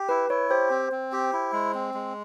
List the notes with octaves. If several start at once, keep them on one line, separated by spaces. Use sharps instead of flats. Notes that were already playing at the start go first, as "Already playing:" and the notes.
Already playing: G4
E4 B4
E4 C#5
G4 C5
C4
C4
G4
E4
G#3
C4
G#3